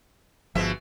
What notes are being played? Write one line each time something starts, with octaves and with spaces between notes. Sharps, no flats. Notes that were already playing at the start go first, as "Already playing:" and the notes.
G1 B2 F3 G#3 E5